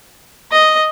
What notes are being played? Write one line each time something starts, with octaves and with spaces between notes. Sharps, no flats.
D#5